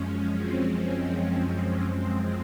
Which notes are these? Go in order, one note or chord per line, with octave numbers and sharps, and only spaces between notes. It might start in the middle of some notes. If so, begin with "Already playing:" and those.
Already playing: F#2 F3 G#3 C#4
C4
C4
F#2 F3 G#3